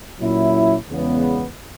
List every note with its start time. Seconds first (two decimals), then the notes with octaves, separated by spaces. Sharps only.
0.20 A#2 F#3 C#4 E4
0.90 E2 C#3 G#3 B3